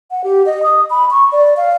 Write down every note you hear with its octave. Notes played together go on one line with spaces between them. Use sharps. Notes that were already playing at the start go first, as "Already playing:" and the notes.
F#5
G4
D#5
D#6
B5
C#6
D5
F5